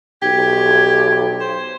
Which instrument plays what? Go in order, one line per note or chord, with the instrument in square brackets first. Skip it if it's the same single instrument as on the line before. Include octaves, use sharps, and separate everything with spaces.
[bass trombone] B1 [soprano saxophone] G4 [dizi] G#6
[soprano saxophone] C5